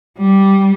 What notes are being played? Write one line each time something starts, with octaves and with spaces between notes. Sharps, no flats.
G3